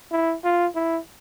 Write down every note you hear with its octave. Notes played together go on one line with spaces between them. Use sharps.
E4
F4
E4